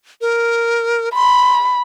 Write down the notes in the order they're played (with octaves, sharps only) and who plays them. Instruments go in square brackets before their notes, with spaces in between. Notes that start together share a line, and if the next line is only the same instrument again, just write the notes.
[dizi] A#4
[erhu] B5 [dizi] C6